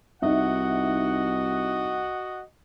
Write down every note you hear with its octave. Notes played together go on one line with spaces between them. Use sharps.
C2 D#4 F#4 D#5 E5 F#5